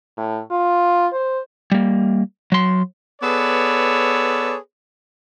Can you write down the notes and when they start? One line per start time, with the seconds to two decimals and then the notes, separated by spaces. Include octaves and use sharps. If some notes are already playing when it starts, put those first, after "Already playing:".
0.17 A2
0.51 F4
1.13 C5
1.72 G3 A#3
2.52 F#3 C6
3.22 B3 G#4 A4 B4 C#5 D5